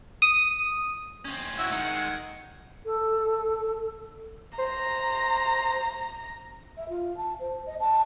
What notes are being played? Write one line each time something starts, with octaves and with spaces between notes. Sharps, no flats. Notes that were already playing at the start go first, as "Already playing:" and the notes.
D#6
C4 C#4
E4 F#4 E6
D#3 G#3 F#5
A4
C5 A#5
E5
F4
A5
C5
D#5
A5